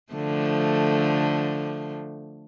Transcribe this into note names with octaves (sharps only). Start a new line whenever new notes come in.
D3 F3 A3